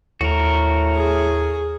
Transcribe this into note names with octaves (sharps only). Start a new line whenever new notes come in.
D#2 A2 F#4 A#4
G#4